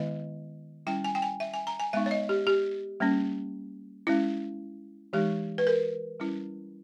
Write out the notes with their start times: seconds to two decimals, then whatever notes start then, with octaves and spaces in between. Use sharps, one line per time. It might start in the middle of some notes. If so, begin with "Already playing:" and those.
Already playing: D#3 G#3 B3 E4 D#5
0.87 G3 C#4 E4 G5
1.04 G#5
1.15 G5
1.22 G#5
1.40 E5
1.54 G#5
1.67 A#5
1.80 G#5
1.93 G#3 B3 D#4 E5
2.06 C#5
2.11 D#5
2.29 G4
2.47 G4
3.00 G3 A#3 C#4
4.07 G#3 C#4 E4
5.13 E3 G#3 D#4 G4
5.58 B4
5.67 A#4
6.20 G3 C#4 E4